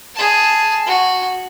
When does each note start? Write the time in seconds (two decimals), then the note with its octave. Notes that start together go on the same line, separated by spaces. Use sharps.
0.15 G#4 A5
0.86 F#4